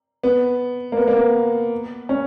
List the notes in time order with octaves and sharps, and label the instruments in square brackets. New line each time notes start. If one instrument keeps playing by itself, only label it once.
[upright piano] B3
A#3
B3
A#3
B3
C#4